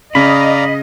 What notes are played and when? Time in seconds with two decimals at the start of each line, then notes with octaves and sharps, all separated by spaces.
0.15 C#3 D5 D#5 F5 A#5 B5